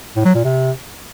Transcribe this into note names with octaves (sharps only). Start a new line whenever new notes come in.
A2
F#3
A#2
C3